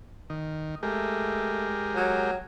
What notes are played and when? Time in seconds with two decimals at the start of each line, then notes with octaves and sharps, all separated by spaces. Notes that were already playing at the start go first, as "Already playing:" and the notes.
0.30 D#3
0.83 G#3 A3 G4 A#4
1.95 F#3